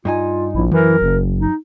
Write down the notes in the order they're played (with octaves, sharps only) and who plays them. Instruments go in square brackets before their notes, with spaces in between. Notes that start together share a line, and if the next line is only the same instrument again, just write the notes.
[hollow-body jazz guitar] G2 D#4 G#5 [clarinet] F4
[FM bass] A#1 [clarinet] E4
[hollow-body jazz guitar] F#2 [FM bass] E3 [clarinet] A#4
[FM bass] F#1
[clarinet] D#4